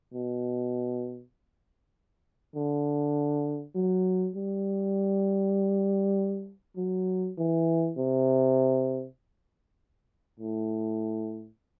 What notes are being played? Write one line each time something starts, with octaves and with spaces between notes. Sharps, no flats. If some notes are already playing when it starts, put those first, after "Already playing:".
B2
D3
F#3
G3
F#3
E3
C3
A2